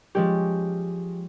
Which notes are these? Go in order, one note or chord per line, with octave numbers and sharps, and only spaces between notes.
F3 G#3 C#4 G4